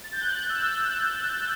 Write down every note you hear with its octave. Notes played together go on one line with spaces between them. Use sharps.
A6
G6
F#6
E6
E6